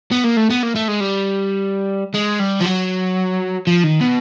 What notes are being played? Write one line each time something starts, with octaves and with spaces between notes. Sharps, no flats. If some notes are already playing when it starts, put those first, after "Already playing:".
B3
A#3
A3
B3
A#3
A3
G#3
G3
G#3
G3
F3
F#3
F3
D#3
B2